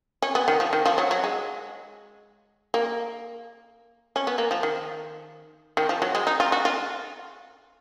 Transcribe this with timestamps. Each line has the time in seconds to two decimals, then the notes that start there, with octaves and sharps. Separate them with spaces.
0.22 C#4
0.35 B3
0.48 D#3
0.60 F3
0.73 D#3
0.86 F3
0.98 F#3
1.11 F#3
1.24 G#3
2.74 A#3
4.16 C#4
4.27 B3
4.38 A#3
4.51 F3
4.63 D#3
5.77 D#3
5.89 F3
6.02 F#3
6.15 G#3
6.27 D#4
6.40 F4
6.52 F#4
6.65 F4